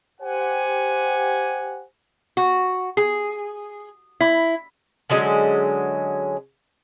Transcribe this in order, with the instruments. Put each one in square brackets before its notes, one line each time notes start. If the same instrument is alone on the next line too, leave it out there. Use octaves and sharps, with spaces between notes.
[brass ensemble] G4 C5 F#5 G#5
[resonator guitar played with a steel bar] F#4
G#4
E4
[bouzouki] D3 F#3 G#3 C#4